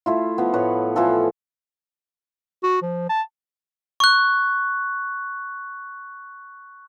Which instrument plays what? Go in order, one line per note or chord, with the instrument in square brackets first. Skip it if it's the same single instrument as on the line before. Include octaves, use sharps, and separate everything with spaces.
[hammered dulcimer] A3 E4 F4
F3 B3
A2 B4 C#5
E3 F3 F4 A4
[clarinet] F#4
F3
A5
[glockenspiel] C#6 F#6